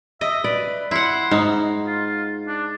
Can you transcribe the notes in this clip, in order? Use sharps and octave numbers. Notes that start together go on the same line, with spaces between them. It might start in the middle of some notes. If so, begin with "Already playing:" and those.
D#5 E5
B4 D5
E4 F#5 C6
G#2 D#4
F4
D4